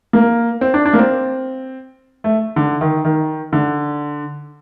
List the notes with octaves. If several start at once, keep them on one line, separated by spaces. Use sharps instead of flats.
A#3
C4
D4
D4
A#3
C4
A3
D3
D#3
D#3
D3